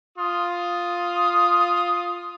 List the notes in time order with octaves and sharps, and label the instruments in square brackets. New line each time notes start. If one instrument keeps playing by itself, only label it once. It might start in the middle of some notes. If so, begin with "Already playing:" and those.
[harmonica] F4 D#6